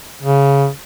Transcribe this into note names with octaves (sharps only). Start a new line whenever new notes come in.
C#3